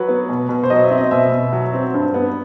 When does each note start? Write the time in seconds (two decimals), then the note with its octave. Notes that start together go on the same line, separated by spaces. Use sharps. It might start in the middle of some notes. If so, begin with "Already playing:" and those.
Already playing: F#3 B4
0.08 B3
0.29 B2
0.49 B2
0.63 C5
0.70 F#3 D#5
0.84 E5
0.91 C4
0.98 D#5
1.11 B2 E5
1.32 B2
1.52 F#3
1.73 C4
1.94 G2
2.14 B3